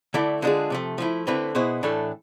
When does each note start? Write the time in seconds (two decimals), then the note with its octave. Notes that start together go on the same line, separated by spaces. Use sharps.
0.14 D3 A3 E4 A4 D5
0.42 D3 G#3 D4 F4 G#4
0.70 C3 F3 A3
0.98 F3 A3 E4
1.27 D3 A3 C4 E4 B4
1.55 B2 B3 E4 G#4 C5
1.83 A2 E3 A3 D4 A4